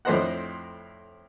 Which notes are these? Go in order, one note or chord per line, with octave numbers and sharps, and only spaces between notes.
F2 A2 D4 C5 D#5 F#5